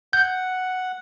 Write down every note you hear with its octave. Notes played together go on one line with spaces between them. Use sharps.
F#5 G6